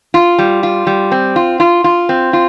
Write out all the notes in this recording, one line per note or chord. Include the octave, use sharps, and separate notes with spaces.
F4
G3
F4
G3
C4
F4
F4
F4
C4
F4